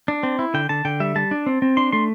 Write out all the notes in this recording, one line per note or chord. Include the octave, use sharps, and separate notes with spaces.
D4
C4
E4
D3 G5
D3 A5
D3 G5
G3 E5
G3 A5
D4
C4
C4
D4 C6
A3 C6